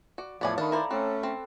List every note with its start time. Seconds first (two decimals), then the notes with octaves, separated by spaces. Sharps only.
0.18 F#4 D5
0.41 E2 A2 F3 A3 B3 C#5 D5 G#5
0.58 D#3 D4 F5 A5 B5
0.72 E4 C5 D5 A5 A#5
0.91 A3 C4 C#4 A4 D5 F#5
1.23 C4